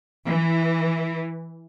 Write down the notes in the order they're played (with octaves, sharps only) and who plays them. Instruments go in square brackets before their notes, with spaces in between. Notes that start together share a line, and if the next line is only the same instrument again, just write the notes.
[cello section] E3